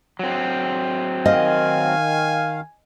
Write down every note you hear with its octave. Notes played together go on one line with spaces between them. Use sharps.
F#3 C4
D#3 D#5 F5 G#5